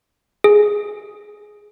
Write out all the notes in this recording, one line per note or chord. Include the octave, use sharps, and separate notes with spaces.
G#4